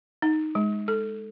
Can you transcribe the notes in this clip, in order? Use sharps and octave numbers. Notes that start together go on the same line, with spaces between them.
D#4
G#3
A4